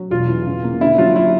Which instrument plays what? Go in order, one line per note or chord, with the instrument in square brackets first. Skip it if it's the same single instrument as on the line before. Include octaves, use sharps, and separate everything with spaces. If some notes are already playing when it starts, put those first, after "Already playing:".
Already playing: [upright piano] F#3
[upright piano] E1 [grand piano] F4
[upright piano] E3
C#3
A#3
[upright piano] D3 [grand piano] E4
[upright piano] F#3 [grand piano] F4
[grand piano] E4